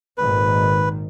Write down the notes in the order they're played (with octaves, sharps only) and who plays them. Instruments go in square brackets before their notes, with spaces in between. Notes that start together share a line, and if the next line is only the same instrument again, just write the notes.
[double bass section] G#1 A#2 D#3 [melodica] B4